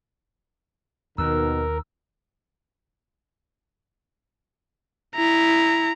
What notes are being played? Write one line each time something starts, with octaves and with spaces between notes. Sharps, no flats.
D#2 B2 D#3 A#4 E6
E4 A#5